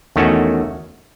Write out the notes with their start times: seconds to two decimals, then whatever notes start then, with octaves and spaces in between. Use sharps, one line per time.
0.16 E2 D#3 A3 C#4 F#4